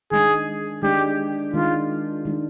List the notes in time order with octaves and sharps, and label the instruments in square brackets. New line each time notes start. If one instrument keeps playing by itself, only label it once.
[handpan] D#3 G#3 D4 [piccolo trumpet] G#4
[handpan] D#3 G#3 D4 [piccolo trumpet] G4
[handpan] D#3 G#3 D4 [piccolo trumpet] F4
[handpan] D#3 G#3 D4